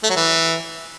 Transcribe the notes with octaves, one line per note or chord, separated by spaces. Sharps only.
A3
F#3
E3